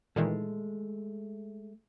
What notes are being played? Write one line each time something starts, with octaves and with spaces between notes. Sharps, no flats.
A#2 D#3 E3 G#3 A3